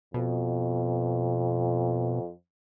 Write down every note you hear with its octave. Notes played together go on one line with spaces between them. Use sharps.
F2 B2